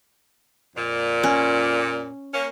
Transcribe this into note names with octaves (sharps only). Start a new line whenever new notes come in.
F2 A#2
C#4
A#3 C#4